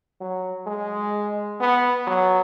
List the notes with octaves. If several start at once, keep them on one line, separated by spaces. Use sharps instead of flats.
F#3
G#3
B3
F#3